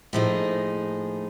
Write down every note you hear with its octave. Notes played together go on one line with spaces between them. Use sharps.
A2 F3 A#3 D#4 G#4